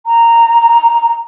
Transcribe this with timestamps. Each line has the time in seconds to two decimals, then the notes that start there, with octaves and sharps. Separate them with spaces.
0.06 A#5